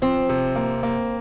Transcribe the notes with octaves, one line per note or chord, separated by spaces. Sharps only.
F3 C4
C3
A#3
A#3